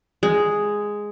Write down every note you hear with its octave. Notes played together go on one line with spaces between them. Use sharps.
G#3